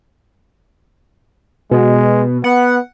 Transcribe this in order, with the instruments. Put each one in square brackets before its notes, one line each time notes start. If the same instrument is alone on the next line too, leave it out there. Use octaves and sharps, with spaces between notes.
[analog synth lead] B2 [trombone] G#3
[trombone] B3 [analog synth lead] F#5